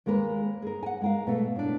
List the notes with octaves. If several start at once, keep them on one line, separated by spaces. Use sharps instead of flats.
D#2 G#3 A#3 A#4 B4
G#4 A#4
F#5 G#5
G#3 A#4 F5
B2 A3
A2 D4